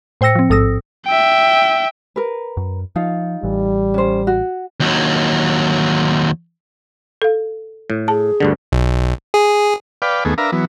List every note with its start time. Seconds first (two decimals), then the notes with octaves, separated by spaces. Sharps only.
0.21 A2 C5 G5 E6 A#6 C#7
0.35 F3 C4
0.50 A1 G#2 A4 D#6 E6 A#6
1.06 E5 G5
2.16 A#4 B4
2.57 F#2
2.96 F3 D#4 F4 F5
3.43 A1 E3 G3
3.94 C#4 C5
4.27 F#4
4.80 D#2 F#3
7.22 A4 F5
7.90 A2
8.08 G#4 A5
8.40 D2 G2 D3
8.72 B1
9.34 G#4
10.02 B4 D5 F5 G5
10.25 D#2 A3 B3 G#4
10.38 D4 A#4 B4 E5 F5 A#5
10.52 E3 F#3 B3